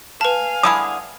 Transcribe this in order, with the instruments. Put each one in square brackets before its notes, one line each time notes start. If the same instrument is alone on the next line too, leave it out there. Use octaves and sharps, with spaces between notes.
[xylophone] B4 A5 [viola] F5 G#5
[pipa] D3 E4 G#4 [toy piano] D#6